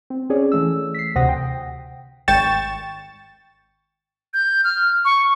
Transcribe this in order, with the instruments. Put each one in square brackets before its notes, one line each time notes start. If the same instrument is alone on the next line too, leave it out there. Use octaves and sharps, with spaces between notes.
[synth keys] C4
C4 C#4 G#4 C#5 D5
E3 A3 E6
B6 C7
D2 C3 C5 F#5 D#6 A#6
G5
[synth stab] G#1 G5 C#6 A6 E7
[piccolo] G6
F6
C#6